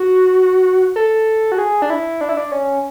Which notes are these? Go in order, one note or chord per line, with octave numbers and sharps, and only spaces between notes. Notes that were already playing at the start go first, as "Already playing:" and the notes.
Already playing: F#4
A4
F#4
G#4
D4
E4
D4
E4
D4
C#4